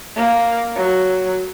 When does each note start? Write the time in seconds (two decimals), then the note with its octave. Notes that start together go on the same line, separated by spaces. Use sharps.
0.16 A#3
0.75 F#3